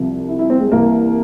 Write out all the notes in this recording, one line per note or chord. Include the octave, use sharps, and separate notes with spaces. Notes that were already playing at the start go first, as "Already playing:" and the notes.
Already playing: C2 C3 F3
E4
E4
C4
G#3
C2 C3 E3 A#3